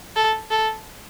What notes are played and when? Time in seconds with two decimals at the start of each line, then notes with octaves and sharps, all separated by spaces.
0.16 A4
0.51 A4